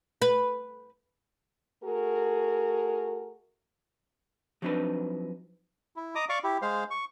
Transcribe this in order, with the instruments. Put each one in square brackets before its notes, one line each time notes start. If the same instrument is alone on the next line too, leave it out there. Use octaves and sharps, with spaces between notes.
[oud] B4
[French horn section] A3 F#4 G#4 A#4
[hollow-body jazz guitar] F3 F#3 C4 D4 D#4 B4
[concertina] E4
D#5 A#5 D6 D#6
D5 F5 C#6 D6
E4 G4
G#3 C5 F5
C#6